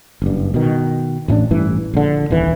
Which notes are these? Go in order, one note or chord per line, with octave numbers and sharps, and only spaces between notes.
F#1 G2
B2 D#3
A1 A2 C#4 D4
A1 G2 E3
A#1 D3
D#1 C2 E3